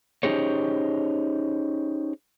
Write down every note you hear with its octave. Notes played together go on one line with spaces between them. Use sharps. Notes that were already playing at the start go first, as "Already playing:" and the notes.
C#4 D#4 G4 G#4 C5 C#5